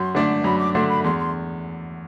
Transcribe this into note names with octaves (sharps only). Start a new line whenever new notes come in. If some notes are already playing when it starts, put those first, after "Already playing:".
Already playing: F#2 C6
D3 A3 D4
F#2 B5
D6
D3 A3 D4 C6
B5
E2 C6
C6